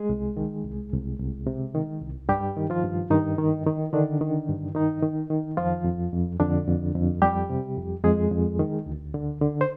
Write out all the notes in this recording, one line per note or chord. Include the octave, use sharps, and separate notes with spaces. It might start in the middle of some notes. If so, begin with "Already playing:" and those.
Already playing: G#3 G#4
C2
D#3
C2
C2
C2
C3
D#3
C2
G2 G3 G4
D#3
F3 F4
G2
G2 D#3 D#4
D#3
D#3
D3 D#3 D4
D#3
G2
D#3 D#4
D#3
D#3
F2 F3 F4
F2
F2
F2 D3 D4
F2
F2
F2 G3 G4
C3
F2
F2 G#3 G#4
F2
D#3
D2
D3
D3
C5